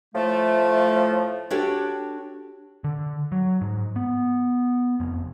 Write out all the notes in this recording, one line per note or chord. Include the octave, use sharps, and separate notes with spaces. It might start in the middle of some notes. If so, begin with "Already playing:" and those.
A2 F3 A3
D4 F#4 G4 A4 C#5 G5
D3
F#3
G#2
B3
F1